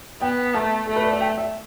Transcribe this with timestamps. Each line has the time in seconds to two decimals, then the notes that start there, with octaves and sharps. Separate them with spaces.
0.22 B3 G5
0.54 A3 A5
0.87 A3 A4
0.96 B4
1.04 D5
1.13 E5
1.21 G5
1.38 E5